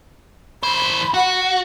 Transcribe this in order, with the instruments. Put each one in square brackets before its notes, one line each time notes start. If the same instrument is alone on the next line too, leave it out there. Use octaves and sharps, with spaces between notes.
[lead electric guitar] E3 C5 [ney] B5
[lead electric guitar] F#4 [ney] F#5